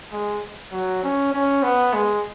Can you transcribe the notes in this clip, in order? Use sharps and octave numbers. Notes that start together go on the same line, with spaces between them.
G#3
F#3
C#4
C#4
B3
G#3